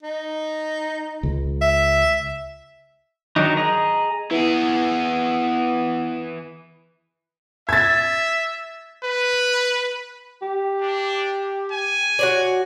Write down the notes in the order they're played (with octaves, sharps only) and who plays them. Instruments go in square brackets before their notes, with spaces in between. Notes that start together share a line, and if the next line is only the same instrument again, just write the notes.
[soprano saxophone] D#4
[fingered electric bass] C#2
[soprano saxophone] E5
[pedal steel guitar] D#3 F#3 D4 D#4
G#4 D#5 A#5
[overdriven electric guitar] E3 G#4 [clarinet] B3 [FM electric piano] E4 B4
[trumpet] E5 [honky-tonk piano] G#6 A6
[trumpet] B4
[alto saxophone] G4
[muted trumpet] D4
G#5
[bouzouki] F#4 C#5 D5